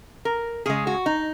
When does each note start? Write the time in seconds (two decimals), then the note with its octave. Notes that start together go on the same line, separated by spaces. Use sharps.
0.25 A#4
0.66 C#3 G#3 G#4
0.87 F#4
1.06 D#4